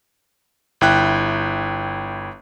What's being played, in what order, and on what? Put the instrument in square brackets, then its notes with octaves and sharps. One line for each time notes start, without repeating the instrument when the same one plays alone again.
[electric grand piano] G1 E4 G5 F#6